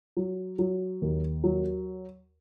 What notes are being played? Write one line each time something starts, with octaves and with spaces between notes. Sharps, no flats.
F#3
F#3
D#2
F#3